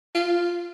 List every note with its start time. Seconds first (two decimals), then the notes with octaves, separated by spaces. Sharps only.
0.15 F4